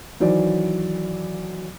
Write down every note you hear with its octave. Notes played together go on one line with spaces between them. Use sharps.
D#3 E3 F#3 C5 D5